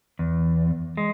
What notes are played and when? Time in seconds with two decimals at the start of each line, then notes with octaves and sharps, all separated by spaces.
0.19 E2
0.97 G#3